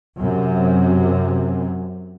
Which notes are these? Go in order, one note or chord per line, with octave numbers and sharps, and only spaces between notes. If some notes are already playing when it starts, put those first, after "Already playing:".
F#2 C3